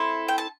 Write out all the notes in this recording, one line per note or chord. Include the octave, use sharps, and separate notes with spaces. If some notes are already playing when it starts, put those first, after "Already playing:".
Already playing: C4 E4 A4
G5
A5